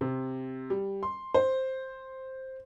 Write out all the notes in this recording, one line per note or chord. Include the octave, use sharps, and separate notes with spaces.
C3
G3
C6
C5